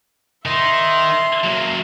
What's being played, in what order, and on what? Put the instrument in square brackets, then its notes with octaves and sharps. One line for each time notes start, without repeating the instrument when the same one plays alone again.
[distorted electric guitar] D#3 D#4 [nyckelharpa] E5 C6
[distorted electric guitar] F#3 A#3